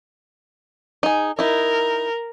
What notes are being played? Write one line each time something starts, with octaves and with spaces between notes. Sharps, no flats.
D#4 G#4
D#4 E4 A#4